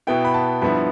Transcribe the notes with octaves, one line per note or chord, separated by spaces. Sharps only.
B2 B3 E4 G5
B5
A5
G2 F3 B3 E4 B5